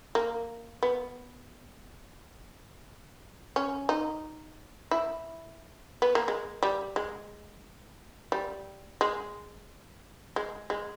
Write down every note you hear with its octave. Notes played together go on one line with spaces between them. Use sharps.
A#3
B3
C#4
D#4
E4
B3
A#3
G#3
G3
G#3
G3
G#3
G#3
G#3